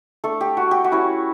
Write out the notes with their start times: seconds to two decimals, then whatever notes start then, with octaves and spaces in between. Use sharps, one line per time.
0.24 A3 D4 A4
0.41 G4
0.57 F#4
0.71 G4
0.84 F#4
0.92 G3 C#4 E4